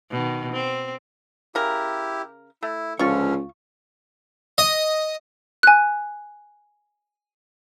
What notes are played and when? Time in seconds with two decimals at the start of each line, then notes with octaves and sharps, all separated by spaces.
0.11 B2 D#3
0.52 C4
1.55 C#3 E4 G4 A#4
2.63 A3 E4
2.99 C#2 D3 F3 C#4 F4 C#6
4.58 D#5
5.63 G#5 F#6